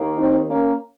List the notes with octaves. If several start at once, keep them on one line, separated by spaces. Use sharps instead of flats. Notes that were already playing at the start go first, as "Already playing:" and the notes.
Already playing: D#2 D#3 A#3
C4 D#4
A#3 C#4